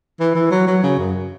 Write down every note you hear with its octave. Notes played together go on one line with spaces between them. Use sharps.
E3
E3
F#3
F#3
C#3
F#2